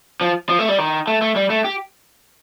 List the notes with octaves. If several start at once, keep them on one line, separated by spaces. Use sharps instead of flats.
F3
F3
A3
G3
D#3
A3
A3
G3
A3
G4